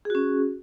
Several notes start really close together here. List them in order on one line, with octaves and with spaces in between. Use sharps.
G#4 F#4 C#4